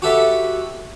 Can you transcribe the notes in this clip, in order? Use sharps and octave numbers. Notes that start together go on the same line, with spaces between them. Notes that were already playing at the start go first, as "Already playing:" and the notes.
F#4 G4 A4 B4 E5